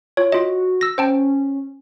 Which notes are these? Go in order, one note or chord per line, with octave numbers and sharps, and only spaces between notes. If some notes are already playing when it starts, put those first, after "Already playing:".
F4 C#5
F4 F#4 D#5
E6 A#6
C#4 C5 G5 A5